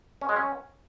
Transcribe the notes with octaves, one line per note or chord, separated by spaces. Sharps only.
C#4
G#3
C#4